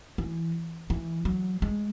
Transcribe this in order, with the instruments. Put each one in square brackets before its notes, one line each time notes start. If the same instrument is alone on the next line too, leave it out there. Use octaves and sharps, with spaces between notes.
[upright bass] E3
E3
F#3
G#3